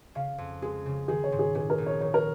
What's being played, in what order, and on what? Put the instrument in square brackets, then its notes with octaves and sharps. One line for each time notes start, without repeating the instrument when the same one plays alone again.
[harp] C#3 [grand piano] F5
[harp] F2
[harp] G#3 [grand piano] G#4
[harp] C#3
[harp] D#3 [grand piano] G#4
[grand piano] C#5
[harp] G#2
[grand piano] G#4
[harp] A#2 [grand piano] G#4
[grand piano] A#4
[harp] A#1
[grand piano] C#5
[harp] D#3 [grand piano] C#5
[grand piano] A#4